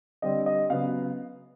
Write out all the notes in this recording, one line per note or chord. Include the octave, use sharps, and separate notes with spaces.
D3 G3 C4 D#5
D#5
C#3 F#3 B3 F5